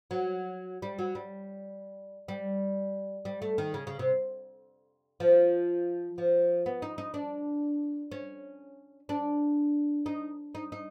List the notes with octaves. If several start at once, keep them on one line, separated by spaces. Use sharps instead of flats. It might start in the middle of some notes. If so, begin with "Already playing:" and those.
F#3
G3
F#3
G3
G3
G3
A3
D#3
C#3
C#3
C3
F3
F3
B3
D#4
D#4
D4
C#4
D4
D#4
D#4
D#4